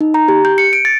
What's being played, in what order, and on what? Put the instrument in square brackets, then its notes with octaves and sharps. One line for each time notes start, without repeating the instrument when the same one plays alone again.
[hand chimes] D#4
A#5
G4
G6
C#7
D7
A6